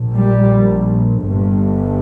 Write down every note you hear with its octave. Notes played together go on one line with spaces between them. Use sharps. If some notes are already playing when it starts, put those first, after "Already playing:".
Already playing: A#1 A#2
G3
G1 G2